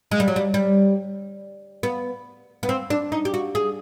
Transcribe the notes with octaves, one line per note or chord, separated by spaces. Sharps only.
G#3
G3
F#3
G3
G3
B3
B3
C4
D4
D#4
G4
F#4
G#4